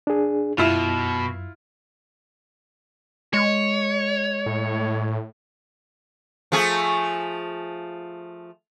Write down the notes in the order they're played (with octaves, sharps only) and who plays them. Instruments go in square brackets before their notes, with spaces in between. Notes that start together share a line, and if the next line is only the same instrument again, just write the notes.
[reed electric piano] D4 G#4
[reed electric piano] F#2 [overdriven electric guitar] B2 [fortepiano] E4 F4
[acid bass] G#3 [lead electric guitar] C#5
[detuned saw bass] A2
[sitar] F3 A3 G#4